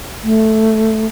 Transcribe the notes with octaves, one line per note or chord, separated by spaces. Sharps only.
A3